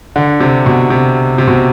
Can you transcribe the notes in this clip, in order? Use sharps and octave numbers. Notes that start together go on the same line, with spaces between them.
D3
C3
B2
C3
C3
B2